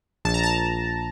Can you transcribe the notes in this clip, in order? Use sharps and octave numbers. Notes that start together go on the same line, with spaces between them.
A#1 A5
A#5
A5